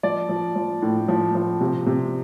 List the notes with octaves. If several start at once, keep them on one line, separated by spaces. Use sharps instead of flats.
F3 D5
F3
F3
A2
F3
F3
C3
C3